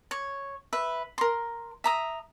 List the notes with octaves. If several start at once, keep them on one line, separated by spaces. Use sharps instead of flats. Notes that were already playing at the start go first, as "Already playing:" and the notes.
C#5
B4 E5
A#4 C6
E5 A#5 D#6